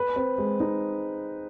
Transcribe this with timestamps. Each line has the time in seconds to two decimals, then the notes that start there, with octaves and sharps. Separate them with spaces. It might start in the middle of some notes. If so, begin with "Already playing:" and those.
Already playing: B4
0.16 C4
0.38 G#3
0.60 D#4